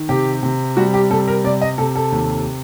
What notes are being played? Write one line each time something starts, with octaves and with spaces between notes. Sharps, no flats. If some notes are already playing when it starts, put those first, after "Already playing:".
Already playing: D#3
C3 G4
C3
G3 F#4
G4
C3 A4
A#4
C3 D5
D#5
C3 A4
A4
D#2